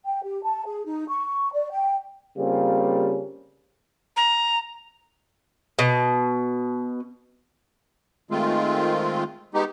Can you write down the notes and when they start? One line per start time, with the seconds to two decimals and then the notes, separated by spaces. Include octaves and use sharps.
0.05 G5
0.24 G4
0.44 A5
0.66 G#4
0.86 D#4
1.09 C#6
1.53 D5
1.71 G5
2.38 C#3 G3 A#3 C4 C#4 F4
4.17 A#5
5.79 B2
8.31 D#3 G#3 A3 C4 F4
9.54 G#3 B3 D#4 G4